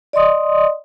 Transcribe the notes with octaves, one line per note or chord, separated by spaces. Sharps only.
D5 D#5 C6 D#6